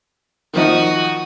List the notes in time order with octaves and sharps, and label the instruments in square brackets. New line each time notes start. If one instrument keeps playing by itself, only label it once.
[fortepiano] D#3 F3 D#4 [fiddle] F#4 D#6